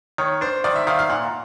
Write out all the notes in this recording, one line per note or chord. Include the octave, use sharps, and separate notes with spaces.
D#3 C#5
D4 C5
D#3 D5
E5
D#3 F5
F5
A#2 F#5